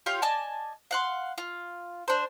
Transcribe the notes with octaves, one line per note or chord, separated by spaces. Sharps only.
F4 G4 C#5 F5
D5 D#5 G#5 A5
F5 F#5 C6
F4
D4 C5